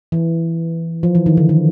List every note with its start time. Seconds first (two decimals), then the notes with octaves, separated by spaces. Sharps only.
0.12 E3
1.03 F3
1.15 E3
1.26 D#3
1.37 D3
1.49 D#3